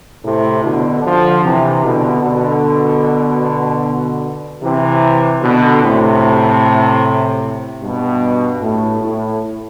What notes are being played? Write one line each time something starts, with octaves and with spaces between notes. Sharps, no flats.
A2 C3
B2 D3
D3 F3
C3 E3
B2 D3
B2 D3
C3 E3
B2 D3
A2 C3
G2 B2
A2
A2